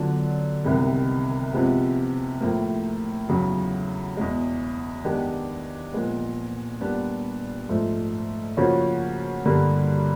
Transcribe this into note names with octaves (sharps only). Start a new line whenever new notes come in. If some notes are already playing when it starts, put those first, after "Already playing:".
Already playing: D3 F#3 B3 D4 F4
C2 C3 D#3 G#3 B3
C3 F3 G#3 B3
A2 F3 A#3
E2 C#3 F#3
E2 B2 G#3
D#3 G#3 B3 D4 G4
A#2 F3 G#3 B3
A#2 G3 B3 D4
G#2 F3 A3
C#3 F3 A#3 C#4 F#4
G2 D3 G3 A#3